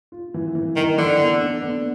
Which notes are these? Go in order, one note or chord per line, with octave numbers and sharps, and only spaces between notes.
F4
E3
E3
D#3 E3
D3 E3
B3
D4
B3